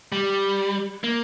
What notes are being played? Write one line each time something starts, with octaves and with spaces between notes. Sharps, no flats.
G3
A#3